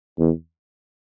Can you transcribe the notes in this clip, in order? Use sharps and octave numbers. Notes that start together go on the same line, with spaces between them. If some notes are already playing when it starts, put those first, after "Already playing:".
E2